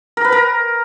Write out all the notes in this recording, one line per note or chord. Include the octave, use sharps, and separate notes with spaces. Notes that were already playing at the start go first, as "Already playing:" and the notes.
A#4
B4
A#4